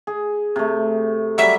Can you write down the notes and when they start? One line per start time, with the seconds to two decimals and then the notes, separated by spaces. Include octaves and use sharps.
0.07 G#4
0.56 C3 A3
1.38 F#3 G3 E5